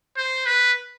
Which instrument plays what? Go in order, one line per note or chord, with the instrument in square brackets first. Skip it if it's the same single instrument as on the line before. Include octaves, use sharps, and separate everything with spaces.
[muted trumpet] C5
B4